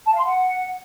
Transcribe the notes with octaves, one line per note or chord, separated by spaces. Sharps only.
A5
F5
C6
F#5